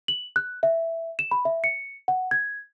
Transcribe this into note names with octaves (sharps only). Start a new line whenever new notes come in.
F#7
F#6
E5
E7
B5
E5
C#7
F#5
G#6